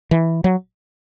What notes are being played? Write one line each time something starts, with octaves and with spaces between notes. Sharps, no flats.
E3
F#3